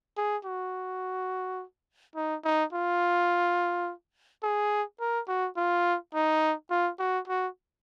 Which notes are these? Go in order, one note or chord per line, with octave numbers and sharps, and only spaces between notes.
G#4
F#4
D#4
D#4
F4
G#4
A#4
F#4
F4
D#4
F4
F#4
F#4